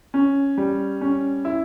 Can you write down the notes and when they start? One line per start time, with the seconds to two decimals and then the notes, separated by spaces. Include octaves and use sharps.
0.14 C#4
0.58 G3
1.01 C#4
1.45 E4